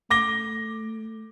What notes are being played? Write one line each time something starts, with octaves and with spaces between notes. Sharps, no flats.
A3 D6 A#6 G7